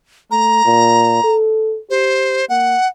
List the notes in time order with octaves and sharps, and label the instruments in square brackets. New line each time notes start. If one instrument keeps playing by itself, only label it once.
[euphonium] A3 [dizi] A#5
[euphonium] A#2
A4
[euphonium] G4 [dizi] C5
[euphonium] A#3 [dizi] F#5